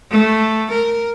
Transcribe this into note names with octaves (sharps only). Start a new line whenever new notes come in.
A3
A#4